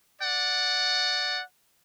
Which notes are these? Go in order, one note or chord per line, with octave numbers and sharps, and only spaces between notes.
D5 F#5